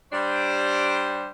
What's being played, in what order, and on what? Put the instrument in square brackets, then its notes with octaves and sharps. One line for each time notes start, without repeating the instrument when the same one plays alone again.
[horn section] G3 D4 C5